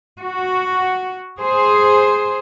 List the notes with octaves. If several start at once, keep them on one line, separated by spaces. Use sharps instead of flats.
F#4
G#4 C5